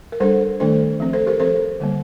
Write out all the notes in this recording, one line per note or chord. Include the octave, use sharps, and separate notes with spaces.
A#4
G3 D4 A4 C5
D#3 A3 D4 A4 C5
F3 C4
A4 C5
G4 A#4
F3 C4 A4 C5
D3 G3 A#3